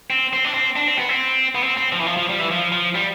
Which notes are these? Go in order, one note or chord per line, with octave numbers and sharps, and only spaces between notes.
C4
C4
D4
C4
D4
C4
B3
C4
B3
C4
C4
F3
E3
F3
F3
G3
E3
F3
F3
G3